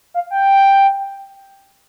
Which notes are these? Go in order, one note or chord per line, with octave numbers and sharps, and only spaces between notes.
F5
G5